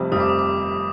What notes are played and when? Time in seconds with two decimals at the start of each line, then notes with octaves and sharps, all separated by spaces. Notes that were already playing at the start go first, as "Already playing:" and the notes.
Already playing: F1 F2 C3 G3
0.12 F1 F2 C3 G3 D#6
0.20 D6
0.29 D#6
0.39 D6